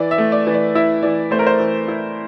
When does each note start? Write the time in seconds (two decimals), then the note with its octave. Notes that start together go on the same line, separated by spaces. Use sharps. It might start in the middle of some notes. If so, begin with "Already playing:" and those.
Already playing: E3 D5
0.11 E5
0.18 A3
0.32 D5
0.47 E3
0.54 D5
0.75 E4 E5
1.03 E3 D5
1.31 A3 C5
1.39 A#4
1.47 C5
1.59 E3
1.88 E4